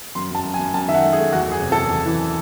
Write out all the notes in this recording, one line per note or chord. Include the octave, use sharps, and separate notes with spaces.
F#2 C6
F#2 A5
F#2
G#5
F#2
F#2 A5
D#3 E5
F#5
A3
G#4
A3
E2 F#4
F#1 G#4
C3
E2 A4
E2
E3